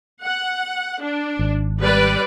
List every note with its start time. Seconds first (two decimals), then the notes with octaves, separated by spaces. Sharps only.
0.24 F#5
1.02 D4
1.39 G#1
1.79 G3 B4 D5